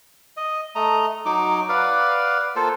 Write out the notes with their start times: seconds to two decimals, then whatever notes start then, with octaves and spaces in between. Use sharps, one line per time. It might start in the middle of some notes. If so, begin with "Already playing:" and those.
0.37 D#5
0.76 A3 D#5 A#5
1.25 F#3 D#4 D6
1.69 B4 D5 F5 F#5
2.56 A#3 F4 A4 C5